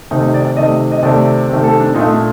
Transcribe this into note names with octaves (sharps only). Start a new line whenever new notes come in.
C3 D#3 A3 D#4
D#4
D5
D5
C3 D#3 A3 D#5
D#5
C3 D#3 A3 D5
C3 D#3 A3
A4
D4
A#2 A3 D#4
D4